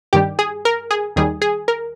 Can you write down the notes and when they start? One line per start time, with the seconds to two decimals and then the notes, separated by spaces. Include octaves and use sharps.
0.13 G2 D#3 G3 G4
0.39 G#4
0.65 A#4
0.91 G#4
1.16 D#2 D#3 G3 G#4
1.42 G#4
1.68 A#4